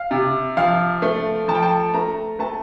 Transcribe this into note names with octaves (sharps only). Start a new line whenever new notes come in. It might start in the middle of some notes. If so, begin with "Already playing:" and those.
Already playing: F5
C3
F3 F5
A3
F3 A5
G5
A5
A3 A#5
A3 A5